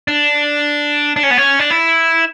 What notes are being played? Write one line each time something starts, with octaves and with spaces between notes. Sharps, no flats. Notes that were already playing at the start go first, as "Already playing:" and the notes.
D4
D4
C#4
B3
C#4
D4
E4